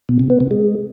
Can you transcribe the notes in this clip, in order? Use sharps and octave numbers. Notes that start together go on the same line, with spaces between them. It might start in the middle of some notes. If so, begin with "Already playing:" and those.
B2
C3
B3
C3
G#3